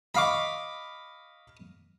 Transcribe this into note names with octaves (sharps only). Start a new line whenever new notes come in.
D#5 F5 B5 C#6 D6